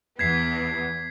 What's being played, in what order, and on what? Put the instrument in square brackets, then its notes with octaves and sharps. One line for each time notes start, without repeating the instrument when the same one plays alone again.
[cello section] E2 B3 [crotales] G#6 B6 C7